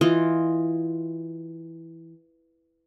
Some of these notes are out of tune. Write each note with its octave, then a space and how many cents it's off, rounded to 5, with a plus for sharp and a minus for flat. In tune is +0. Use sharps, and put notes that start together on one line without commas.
E3 +0 F4 +0 D#5 +0